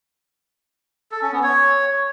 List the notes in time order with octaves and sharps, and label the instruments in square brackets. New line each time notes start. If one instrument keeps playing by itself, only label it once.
[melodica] A4
C#4
B3
C#5